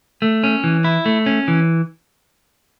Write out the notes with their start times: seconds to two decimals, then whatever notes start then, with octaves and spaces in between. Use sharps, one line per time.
0.22 A3
0.44 C#4
0.64 E3
0.84 E4
1.06 A3
1.26 C#4
1.48 E3